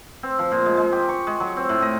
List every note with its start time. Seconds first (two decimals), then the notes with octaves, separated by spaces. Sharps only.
0.23 C4
0.39 F3
0.52 A#2
0.66 G#3
0.77 G#3
0.92 G4
1.09 C#6
1.27 G#3
1.40 F#3
1.57 C4
1.69 A2
1.82 D#5